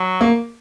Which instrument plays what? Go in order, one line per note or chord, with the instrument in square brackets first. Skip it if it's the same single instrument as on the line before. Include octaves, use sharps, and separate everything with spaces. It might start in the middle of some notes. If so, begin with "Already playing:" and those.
Already playing: [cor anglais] F#3
[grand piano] A#3